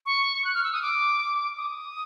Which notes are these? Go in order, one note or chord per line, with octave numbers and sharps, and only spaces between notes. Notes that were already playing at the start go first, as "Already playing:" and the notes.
C#6
F#6
F6
E6
D#6
D6
D#6